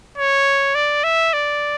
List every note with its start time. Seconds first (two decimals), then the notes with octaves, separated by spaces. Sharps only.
0.18 C#5
0.75 D5
1.04 E5
1.33 D5